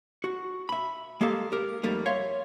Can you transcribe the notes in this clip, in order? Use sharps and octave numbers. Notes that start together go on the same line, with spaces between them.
F#4
E5 B5
G#3 A#3 G4 A4 F5
G4 A#4
F2 G3 A3 A#3 D#4
C#5 E5 F5 C6